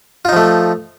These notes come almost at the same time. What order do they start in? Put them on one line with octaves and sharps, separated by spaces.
F4 D#4 F3 A3